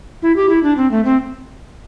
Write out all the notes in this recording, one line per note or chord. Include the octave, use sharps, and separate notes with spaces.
E4
G4
E4
D4
C4
A3
C4